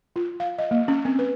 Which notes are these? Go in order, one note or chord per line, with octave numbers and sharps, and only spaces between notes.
F4
F5
D#5
A#3
C#4
C4
B4